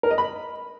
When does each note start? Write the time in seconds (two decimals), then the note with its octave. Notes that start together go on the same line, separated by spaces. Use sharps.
0.03 A#4
0.11 D#5
0.18 B5